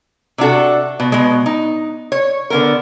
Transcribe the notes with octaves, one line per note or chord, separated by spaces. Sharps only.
C3 D4 F#4 A4
B2
B2 G#3
D#4
C#5
D3 B3 A#4